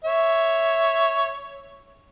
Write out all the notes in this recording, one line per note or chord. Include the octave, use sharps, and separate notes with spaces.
C#5 E5